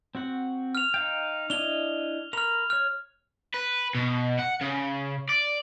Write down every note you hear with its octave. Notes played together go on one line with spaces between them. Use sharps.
C4 F#4 F#5
F6 F7
D#4 F5 G5
D4 E4 D#5 F7 G7
A#4 A#5 B5 F6 F7
C#5 F6 F#6
B4
B2
F#5
C#3
D5